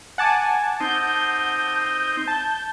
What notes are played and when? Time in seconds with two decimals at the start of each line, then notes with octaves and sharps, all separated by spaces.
0.18 F#5 G#5 A5 D6
0.80 C4 D#4 G6
2.28 A5